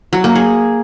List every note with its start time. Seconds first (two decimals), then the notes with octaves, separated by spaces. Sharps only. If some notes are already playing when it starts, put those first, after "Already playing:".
0.13 F#3
0.24 A#3
0.35 G#4